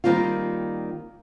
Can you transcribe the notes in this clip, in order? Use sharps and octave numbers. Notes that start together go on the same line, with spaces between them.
D#3 G3 A#3 C4 F4